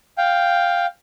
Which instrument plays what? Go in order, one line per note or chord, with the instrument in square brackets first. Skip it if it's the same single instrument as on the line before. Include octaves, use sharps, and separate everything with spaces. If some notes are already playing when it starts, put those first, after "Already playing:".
[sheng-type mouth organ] F5 G5